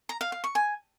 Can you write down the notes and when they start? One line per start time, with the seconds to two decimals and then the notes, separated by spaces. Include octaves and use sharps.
0.09 A#5
0.21 F5
0.32 F5
0.44 C#6
0.55 G#5